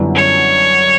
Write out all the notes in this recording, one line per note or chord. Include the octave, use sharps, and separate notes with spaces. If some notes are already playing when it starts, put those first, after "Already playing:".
Already playing: F#2 D3 G3 B3 E4
C#5